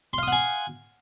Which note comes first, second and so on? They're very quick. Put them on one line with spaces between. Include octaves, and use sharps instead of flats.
C6 F5 D#6 F#5 G#5